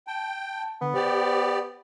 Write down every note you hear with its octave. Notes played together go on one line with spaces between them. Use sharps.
G5 A5
D3 B3
G4 C5 D5